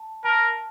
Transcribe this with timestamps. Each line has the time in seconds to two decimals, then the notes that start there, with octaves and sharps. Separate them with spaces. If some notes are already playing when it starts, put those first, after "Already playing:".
Already playing: A5
0.24 A#4 A5